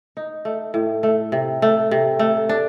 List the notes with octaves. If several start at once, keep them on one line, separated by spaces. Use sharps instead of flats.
D#4
A3
A2
A3
C3
A3
C3
A3
D4